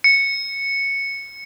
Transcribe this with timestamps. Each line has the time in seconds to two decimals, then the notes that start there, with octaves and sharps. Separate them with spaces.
0.04 C#7